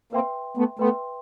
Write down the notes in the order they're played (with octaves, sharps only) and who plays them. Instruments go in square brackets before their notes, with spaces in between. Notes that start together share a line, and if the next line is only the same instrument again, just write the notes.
[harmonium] A#3 C4 [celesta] B4 E5 G5 C6
[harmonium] A3 B3
[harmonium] A3 B3 [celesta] B4 E5 G5 C6